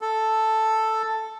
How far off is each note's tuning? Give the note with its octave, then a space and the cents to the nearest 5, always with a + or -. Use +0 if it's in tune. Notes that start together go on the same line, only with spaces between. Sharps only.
A4 +0